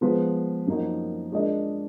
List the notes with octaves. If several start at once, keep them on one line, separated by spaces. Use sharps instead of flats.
F3 G#3 B3 F4 B4
F#2 F3 A#3 D#4 F#4
G#3 D4 F4 A#4 D#5